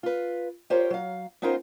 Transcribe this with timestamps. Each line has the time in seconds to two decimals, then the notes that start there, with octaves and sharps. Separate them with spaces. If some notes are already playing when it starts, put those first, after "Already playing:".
0.03 F4 B4
0.70 F4 G4 A#4 C5 C#5
0.90 F#3 F5
1.42 B3 C#4 D#4 F4 A#4 C5